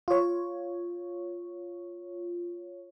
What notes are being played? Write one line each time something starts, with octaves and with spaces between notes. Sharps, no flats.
F4 C#5